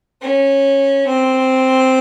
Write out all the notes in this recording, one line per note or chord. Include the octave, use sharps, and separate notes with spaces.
C#4
C4